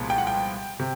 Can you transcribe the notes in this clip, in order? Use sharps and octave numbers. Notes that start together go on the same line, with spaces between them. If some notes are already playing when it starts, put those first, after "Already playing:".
Already playing: C2 A#2 F3 G#3 B3
G5
F#5
G5
C3